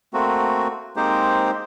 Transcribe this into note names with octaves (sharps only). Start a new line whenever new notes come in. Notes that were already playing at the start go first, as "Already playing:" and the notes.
A3 A#3 C4 F#4
G#3 A#3 C4 D#4 G4 C5